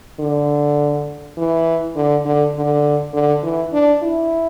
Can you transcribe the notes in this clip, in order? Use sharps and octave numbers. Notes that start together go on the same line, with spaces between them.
D3
E3
D3
D3
D3
D3
E3
D4
E4